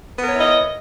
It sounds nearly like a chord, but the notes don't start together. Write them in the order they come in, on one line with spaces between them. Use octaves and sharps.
B3 A#4 C#5 E4 D#5